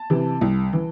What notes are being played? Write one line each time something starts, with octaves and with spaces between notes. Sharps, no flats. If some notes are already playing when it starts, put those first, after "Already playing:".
Already playing: A5
C3 E3
C2
E3